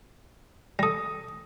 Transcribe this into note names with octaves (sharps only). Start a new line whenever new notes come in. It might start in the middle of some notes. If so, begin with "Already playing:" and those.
G3 A4 D#6 A#6